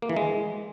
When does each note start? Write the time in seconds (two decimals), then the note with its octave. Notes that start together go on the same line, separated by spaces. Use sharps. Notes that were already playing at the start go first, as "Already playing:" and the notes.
0.02 A#3
0.09 E3
0.17 G#3